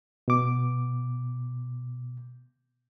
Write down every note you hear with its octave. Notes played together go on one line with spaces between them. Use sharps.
B2 D6